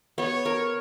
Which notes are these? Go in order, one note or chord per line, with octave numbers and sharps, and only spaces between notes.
B3 C#5
A#4